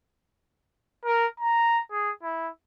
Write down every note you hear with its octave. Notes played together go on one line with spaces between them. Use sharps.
A#4
A#5
G#4
E4